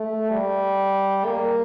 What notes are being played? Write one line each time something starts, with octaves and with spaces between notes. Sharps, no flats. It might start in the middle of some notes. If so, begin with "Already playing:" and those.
Already playing: A3
G3
A#3